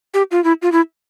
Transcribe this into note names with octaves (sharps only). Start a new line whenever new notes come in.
G4
F4
E4
F4
E4